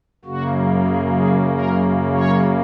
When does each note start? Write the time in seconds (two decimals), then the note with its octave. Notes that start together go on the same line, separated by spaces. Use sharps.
0.25 F#2 C#3 A#3 F#4
0.88 G#4
1.19 G#4
1.50 A#4
2.12 C#5